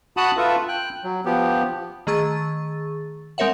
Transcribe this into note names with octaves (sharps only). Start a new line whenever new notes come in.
F#4 F#5 A5 B5 D#6 F#6
F4 A4 B4 E5
G5 F#6
F#3
F3 B3 G4
D#3 A3 G#4 C#6 E6 A6
G#3 C4 A#4 C#5 E5 F#5